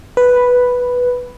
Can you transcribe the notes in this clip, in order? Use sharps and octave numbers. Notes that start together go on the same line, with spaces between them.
B4